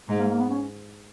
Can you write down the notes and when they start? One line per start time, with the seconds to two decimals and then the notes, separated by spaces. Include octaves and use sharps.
0.08 G#2 G#3
0.19 A#3
0.24 G#3
0.29 A#3
0.39 B3
0.49 C#4